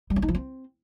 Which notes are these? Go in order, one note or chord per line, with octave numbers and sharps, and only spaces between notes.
G3
C#4
D#4
F3
C4